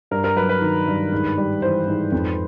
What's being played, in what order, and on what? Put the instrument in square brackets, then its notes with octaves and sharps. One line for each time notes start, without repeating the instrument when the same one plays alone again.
[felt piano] G2 [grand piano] A#4
[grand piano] A#4
[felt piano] F#3 [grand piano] B4
[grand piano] B4
[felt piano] D#3
G2
G#2
G3
[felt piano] E3 [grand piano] C5
[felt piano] G#2
F2